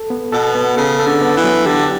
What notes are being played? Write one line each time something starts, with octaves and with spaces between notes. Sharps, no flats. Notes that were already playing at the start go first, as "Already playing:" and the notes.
Already playing: A4
B3
B2 A4
B3
C#3 A4
A4
D3
B3
E3
F#3
D3 G4